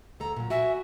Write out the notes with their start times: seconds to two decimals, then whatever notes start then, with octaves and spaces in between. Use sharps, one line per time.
0.20 D2 A4 A#5
0.36 A#2 F#3
0.50 F#4 E5 G#5